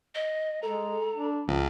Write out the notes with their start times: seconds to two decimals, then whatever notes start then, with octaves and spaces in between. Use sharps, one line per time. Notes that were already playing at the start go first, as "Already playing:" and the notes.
0.15 D#5
0.63 G#3 A4 A#5
1.15 D4
1.48 C#2 F3